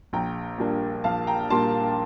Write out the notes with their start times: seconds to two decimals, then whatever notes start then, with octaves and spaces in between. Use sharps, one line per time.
0.13 A#1 G5 A#5
0.58 A#2 G3 A#3 D4
1.04 A#1 F5 A5
1.27 G5 A#5
1.50 A#2 G3 A#3 D4 A5 C6